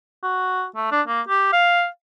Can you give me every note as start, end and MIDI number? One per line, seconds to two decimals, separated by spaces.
0.23 0.65 66
0.76 0.87 57
0.91 1.01 62
1.07 1.21 58
1.28 1.48 67
1.53 1.87 77